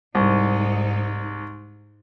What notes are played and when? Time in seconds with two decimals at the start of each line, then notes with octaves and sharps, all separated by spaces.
0.15 C2 G#2 D#4